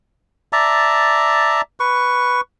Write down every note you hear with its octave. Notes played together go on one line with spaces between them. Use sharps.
D5 E5 A5 A#5
B4 C#6